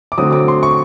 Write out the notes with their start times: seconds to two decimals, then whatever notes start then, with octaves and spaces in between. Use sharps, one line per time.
0.12 D6
0.18 D3 F#3 A3 C4 D#6
0.33 D6
0.48 C6
0.63 C#6